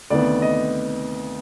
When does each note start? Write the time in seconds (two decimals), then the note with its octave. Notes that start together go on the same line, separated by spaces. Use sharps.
0.10 D2 C3 D#3 B3 D5
0.42 D#5